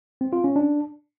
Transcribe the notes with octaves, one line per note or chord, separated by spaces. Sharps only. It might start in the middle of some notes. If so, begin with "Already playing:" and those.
C4
F4
C#4
D4